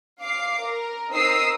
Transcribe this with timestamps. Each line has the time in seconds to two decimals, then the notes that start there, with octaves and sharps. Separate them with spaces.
0.20 F5 D6 C7
0.61 A#4
1.11 C4 D#4 A#4 D#6 E6 C7